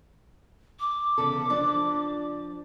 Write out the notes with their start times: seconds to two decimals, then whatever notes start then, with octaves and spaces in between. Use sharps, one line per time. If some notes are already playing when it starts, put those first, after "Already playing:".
0.80 D6
1.18 E2 C#3 A4
1.50 F3 D4